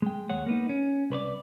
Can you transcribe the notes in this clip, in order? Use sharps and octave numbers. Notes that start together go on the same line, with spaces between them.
G#3 G5
D#2 G#3 C#5 F#5
A#3 B3 D#4
C#4
C2 B4 C#5 D5